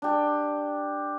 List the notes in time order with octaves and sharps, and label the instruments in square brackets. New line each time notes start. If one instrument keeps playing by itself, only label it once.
[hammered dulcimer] D4 G4